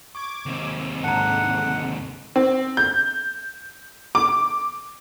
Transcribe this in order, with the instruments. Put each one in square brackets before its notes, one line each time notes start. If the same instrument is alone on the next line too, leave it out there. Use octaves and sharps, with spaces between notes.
[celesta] C#6 [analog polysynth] D6 G#6
[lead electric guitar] D#2 C3
[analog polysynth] G#2 D3 [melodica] F#5 [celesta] A5 A#5
[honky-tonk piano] C4
G6
D6